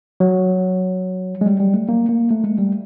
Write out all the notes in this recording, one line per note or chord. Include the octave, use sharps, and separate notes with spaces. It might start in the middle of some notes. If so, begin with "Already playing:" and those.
F#3
G#3
G3
G3
A3
A#3
A#3
A3
G#3
G3